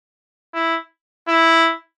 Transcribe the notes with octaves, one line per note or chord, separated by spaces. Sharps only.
E4
E4